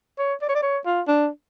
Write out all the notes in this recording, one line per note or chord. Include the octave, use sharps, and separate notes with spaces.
C#5
D5
C#5
D5
C#5
F4
D4